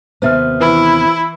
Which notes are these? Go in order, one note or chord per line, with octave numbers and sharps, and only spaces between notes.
D#2 C3 B3 C5 E5 F6
E3 E4